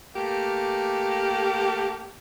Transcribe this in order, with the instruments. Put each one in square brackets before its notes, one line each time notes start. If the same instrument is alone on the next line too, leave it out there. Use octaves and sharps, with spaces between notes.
[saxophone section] A3 A#3 G4